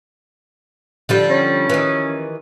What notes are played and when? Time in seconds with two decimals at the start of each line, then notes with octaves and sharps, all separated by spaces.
1.09 D3 F3 G3
1.30 C#4
1.70 D#3 E3